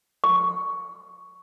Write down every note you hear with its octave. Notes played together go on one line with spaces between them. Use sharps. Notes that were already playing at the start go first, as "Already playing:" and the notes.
C#6